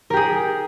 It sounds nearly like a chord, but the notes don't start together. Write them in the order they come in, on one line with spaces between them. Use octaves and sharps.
A#4 G4 G#4